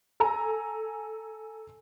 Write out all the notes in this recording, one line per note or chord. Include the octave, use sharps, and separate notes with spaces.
A4 G#5 A#5